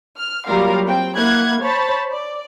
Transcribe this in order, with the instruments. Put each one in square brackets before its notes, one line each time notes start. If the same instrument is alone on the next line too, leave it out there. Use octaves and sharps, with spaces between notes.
[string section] F6
F#3 G3 A#3 F4 A#4 F5
C4 G5
A#3 E4 F#5 F#6 G#6
C5 C#5 A5 B5 A6
D5